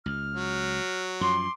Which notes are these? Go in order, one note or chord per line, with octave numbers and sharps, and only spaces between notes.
C#2 F6
F#3
F#2 F3 C6 D6